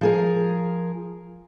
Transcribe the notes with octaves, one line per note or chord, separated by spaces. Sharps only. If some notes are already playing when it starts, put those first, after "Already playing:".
F3 G#4 A#4